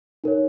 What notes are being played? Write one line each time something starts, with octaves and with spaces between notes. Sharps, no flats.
D#4 A#4 C#5